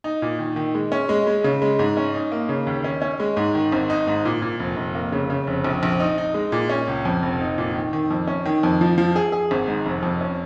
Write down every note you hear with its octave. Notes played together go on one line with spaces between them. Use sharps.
D#4
A#2
D#3
D#3
G#3
C#4
G#3
G#3
C#3
G#3
G#2
C#4
D#4
A#3
C#3
D#2
C#4
C#4
G#3
G#2
D#3
G#1
D#4
G#2
A#2
A#2
F1
F1
A#3
C#3
C#3
F1
A#1
A#1
D#4
D#4
G#3
A#2
C#4
C#2
F2
F1
D#4
A#2
D#3
D#3
F2
C#4
D#3
F2
F3
F3
G#4
G#4
G#1
G#2
F1
F2
C#4